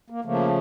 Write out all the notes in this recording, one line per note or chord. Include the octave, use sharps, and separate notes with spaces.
A#3
C#3 F3 A3 A#3